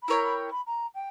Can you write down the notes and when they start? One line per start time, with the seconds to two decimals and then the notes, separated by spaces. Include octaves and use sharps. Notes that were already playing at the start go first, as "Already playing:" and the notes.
0.02 B5
0.08 E4 A#4 C#5 G5 A#5
0.24 B5
0.51 B5
0.67 A#5
0.95 G5